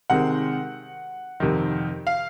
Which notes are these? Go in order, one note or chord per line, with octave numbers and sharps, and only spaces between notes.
C3 D#3 G#3 C4 F#5
F2 C3 D#3
F5